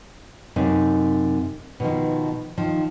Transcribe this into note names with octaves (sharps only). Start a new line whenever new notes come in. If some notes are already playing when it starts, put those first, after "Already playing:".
F#2 C3 D#4
B2 D#3 F3
D#3 F3